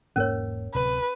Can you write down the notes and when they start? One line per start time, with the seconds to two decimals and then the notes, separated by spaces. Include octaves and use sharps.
0.16 E1 G#2 A#3 C#4 A#4 C#5
0.74 D1 C3 B4